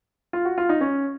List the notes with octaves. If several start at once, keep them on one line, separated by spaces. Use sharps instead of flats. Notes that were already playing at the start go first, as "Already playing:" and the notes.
F4
F#4
F4
D#4
C#4